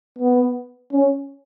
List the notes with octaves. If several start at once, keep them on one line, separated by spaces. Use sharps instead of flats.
B3
C#4